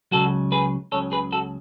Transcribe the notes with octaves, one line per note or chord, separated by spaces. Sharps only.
C#2 C#3 F#3 F#4 A4
G#4 B4
C#2 C#3 F#3 A4 C#5
G#4 B4
F#4 A4